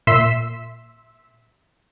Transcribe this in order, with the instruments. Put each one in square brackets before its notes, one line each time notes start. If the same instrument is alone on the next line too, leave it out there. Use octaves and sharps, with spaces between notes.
[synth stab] A#2 E5 C6 E6 B6